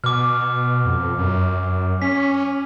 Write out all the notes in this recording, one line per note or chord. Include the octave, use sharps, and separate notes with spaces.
B2 D6 F6
F2
F#2
C#4 B6